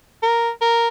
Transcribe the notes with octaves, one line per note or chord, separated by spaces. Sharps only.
A#4
A#4